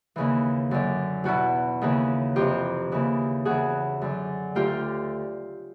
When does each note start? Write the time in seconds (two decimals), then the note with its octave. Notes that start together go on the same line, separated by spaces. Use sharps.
0.16 D#2 C#3 E3
0.71 F#2 D3
1.24 E2 B2 E4 F#4
1.81 D#2 C#3 E3
2.36 F2 C3 E3 F4 G4
2.92 D#2 C#3 E3
3.45 E2 C#3 E3 F#4 G#4
4.01 F#2 D3
4.55 D2 D3 F4 G4